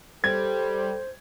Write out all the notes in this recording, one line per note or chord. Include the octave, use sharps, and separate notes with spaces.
G3 A4 C5 G#6